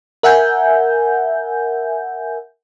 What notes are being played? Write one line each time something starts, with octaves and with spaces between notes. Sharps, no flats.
A#4 E5 F#5 G#5 G6